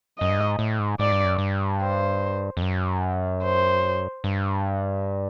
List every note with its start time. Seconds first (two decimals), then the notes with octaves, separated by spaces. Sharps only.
0.19 F#2 D#5
0.30 G2
0.38 G#2
0.59 A2
0.79 G#2
0.99 G#2 D5
1.12 G2
1.25 F#2
1.38 G2
1.81 C5
2.57 F2
2.62 F#2
3.43 C5
4.24 G2